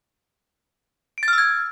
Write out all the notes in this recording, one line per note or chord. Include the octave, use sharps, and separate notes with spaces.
D7
A6
F6
E6
G#6